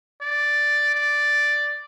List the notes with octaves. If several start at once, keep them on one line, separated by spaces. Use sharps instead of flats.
D5
D5